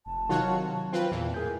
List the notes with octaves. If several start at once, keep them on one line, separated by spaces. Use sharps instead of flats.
F1 A5
C3 D#3 F#3 F4 F#4 C#5 F#6
F3 C4 F4 B4
E2 A#2 E3
A2 G#4 A#4 G6